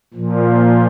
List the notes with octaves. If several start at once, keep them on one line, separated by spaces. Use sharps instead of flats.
A#2 F3